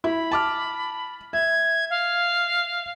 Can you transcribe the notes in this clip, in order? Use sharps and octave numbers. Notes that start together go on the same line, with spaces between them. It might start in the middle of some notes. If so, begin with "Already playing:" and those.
E4 B5
A5 D6 F6
E5 G#6
F5